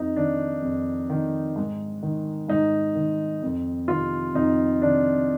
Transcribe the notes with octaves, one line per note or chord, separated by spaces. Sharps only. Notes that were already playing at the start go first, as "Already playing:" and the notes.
Already playing: F2 D#4
D#3 D4
F2
D#3
G#2
D#3
G#2 D#4
D#3
F2
C3 D#3 F4
F2 D#4
C3 D#3 D4